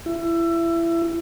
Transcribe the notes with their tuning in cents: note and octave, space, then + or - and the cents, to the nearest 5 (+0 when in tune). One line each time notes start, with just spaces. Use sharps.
E4 +25